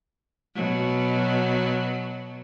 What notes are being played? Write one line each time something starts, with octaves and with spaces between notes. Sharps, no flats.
B2 F#3